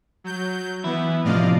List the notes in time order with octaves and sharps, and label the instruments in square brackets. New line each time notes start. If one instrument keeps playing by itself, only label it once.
[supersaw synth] F#3 G6
[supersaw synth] E3 B3 [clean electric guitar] E4
[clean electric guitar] A2 C3 F3 [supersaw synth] D5 D#5 F5